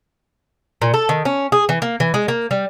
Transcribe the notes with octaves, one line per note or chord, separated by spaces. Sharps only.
A#2
A4
D#3
C#4
G#4
E3
A#3
E3
G#3
A#3
G3